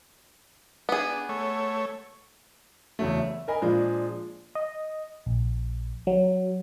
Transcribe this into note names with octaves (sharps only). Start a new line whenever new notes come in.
B3 D4 G#4
A3 C#5
E2 C#3 F#3 A3
E5
A#4 D#5 G#5 B5
A#2 F3 G#3 D4
D#5
A#1
F#3